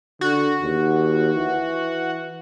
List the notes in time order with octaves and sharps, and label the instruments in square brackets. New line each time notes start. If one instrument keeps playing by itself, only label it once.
[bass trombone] D3 [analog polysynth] F#4
[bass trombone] D#2
E3